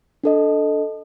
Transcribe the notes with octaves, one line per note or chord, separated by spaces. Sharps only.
D4 A4 D#5